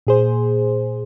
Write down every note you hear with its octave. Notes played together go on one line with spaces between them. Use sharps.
A#2 G#4 C5